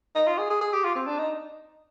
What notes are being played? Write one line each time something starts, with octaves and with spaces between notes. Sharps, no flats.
D#4
F4
G#4
G#4
G#4
G4
F4
C4
D4
D#4